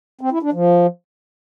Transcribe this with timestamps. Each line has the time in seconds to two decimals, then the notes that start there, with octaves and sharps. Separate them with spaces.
0.21 C4
0.32 E4
0.42 D4
0.53 F3